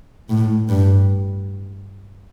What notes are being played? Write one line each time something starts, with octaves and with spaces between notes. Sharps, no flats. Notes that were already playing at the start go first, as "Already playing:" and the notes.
A2
G2